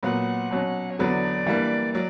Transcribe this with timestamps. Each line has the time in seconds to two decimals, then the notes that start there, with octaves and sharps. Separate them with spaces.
0.03 A#2 F#3 B3 F#5
0.51 B2 F#3 C#4
0.90 C#5
0.99 E2 D3 F#3 B3 D4 D5
1.46 E3 G3 A#3 D4
1.94 F#3 D5